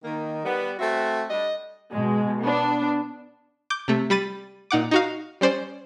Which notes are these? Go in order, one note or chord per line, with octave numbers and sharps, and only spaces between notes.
D#3 A#3
G3 B3
A3 C4 F#4 E5
G3 D4 D#5
B2 G#3
B3 D4
D6 G6
C3 A3
G3 B5 A6 D#7
A#2 D#4 F#5 D6
D#4 F#4 F5
G3 C#4 C5 D5